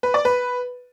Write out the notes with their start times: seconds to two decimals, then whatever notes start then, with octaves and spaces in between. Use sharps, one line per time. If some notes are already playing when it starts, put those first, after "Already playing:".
0.03 B4
0.14 D5
0.25 B4